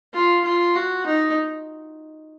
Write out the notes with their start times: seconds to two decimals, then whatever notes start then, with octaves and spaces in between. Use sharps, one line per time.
0.13 F4
0.45 F4
0.75 F#4
1.06 D#4